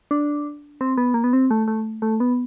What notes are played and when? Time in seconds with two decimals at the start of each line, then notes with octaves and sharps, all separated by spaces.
0.11 D4
0.81 C4
0.98 B3
1.14 A#3
1.24 B3
1.33 C4
1.51 A3
1.68 A3
2.02 A3
2.20 B3